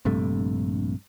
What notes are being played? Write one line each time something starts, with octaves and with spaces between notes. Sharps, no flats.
A#1 G2 C3 A3